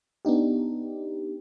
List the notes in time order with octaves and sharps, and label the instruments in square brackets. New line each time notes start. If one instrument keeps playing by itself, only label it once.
[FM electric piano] B3 D4 D#4 G4